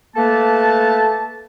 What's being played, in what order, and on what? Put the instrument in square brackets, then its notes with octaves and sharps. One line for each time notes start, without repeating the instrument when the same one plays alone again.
[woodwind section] A3 A#3 B4 A5